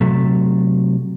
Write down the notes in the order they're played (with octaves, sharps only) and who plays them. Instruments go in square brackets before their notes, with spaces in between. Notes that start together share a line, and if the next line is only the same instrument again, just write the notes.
[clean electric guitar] C3 F#3 A3